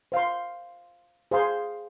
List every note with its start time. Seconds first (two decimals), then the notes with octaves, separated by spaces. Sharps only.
0.12 C5 F5 C6
1.31 G#4 C5 F5 C6